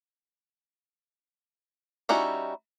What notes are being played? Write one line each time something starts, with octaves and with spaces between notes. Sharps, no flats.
G3 C#4 D#4 E4 F#4